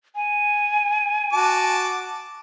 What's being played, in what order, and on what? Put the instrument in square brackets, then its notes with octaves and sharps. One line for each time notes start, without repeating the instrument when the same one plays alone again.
[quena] G#5
[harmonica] F#4 A5 D6